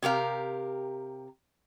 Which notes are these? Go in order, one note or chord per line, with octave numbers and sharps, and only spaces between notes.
C3 G4 A#4 F5